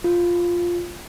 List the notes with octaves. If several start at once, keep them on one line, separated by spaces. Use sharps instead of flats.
F4